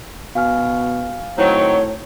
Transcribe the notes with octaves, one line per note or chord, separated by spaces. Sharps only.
B2 F5 G#5 F6
A2 D#3 F#3 C4 C#5